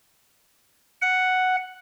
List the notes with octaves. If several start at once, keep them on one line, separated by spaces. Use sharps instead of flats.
F#5